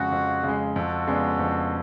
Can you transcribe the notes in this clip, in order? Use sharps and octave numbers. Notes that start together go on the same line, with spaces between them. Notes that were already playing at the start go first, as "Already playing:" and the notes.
Already playing: F2 C#3 G#3 F#4
F2
C#3
G#3
F2 F#4 A4
C#3 G#3 B3 D4
F2